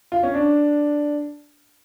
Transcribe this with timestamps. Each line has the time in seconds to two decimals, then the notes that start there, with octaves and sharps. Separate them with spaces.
0.12 F4
0.23 C#4
0.34 D4